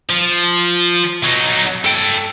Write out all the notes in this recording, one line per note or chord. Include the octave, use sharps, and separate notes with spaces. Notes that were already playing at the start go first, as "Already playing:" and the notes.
F3
F#3 D#4
A4 G5